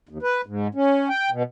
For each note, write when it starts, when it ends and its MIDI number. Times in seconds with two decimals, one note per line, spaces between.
0.09 0.18 39
0.22 0.41 71
0.46 0.68 44
0.75 1.09 61
1.09 1.30 79
1.31 1.43 47